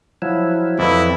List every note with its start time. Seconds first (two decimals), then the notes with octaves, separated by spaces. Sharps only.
0.22 F3 F#3 E4
0.79 F2 E4 B4